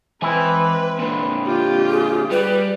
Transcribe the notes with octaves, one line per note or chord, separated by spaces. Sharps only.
E3 G#3 C4 E4 B4 G#5
A#2 D3
F4 G4
G#4
G3 G4 B4